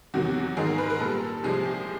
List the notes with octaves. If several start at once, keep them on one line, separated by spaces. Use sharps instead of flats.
E2 C3 D#3 F#3 F#4
G#2 D#3 G#3 G#4
A#4
B4
A#4
A#2 G3 A4
C2 C3 F3 G#3 G#4
G4